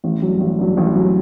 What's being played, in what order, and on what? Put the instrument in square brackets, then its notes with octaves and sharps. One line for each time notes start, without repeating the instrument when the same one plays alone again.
[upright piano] A1
G2 F#3
A1
G2 F#3
A1
F#3